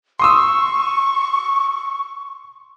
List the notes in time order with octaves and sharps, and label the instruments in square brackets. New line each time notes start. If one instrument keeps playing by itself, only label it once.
[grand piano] C6 D#6 E6 [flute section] C#6